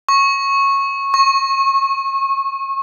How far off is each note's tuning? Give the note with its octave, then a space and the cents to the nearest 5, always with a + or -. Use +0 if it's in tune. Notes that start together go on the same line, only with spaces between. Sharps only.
C#6 -15
C#6 -35